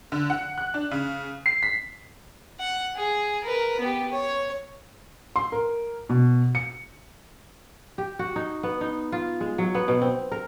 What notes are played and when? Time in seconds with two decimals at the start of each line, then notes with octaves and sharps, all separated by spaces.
0.12 D3
0.30 F#5
0.58 F#6
0.74 D4
0.91 C#3
1.46 C7
1.63 B6
2.60 F#5
2.96 G#4
3.44 A#4 B4
3.80 B3 G4
4.11 C#5
5.36 C6
5.52 A#4
6.09 B2
6.55 C#7
7.98 G4
8.19 F#4
8.36 D#4
8.63 B3
8.81 D#4
9.12 F4
9.40 G#3
9.58 F#3
9.75 B3
9.88 B2
10.01 C4
10.32 A#4